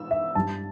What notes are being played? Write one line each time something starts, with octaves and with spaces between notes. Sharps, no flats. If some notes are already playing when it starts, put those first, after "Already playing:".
Already playing: E6
E5
G2 G3 A5